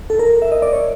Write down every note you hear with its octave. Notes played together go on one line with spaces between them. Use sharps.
A4
A#4
E5
D#5
D5
C#5